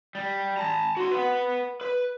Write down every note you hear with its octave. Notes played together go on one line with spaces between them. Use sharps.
G3
A5 A#5
F#4 C6
B4 F#5
B4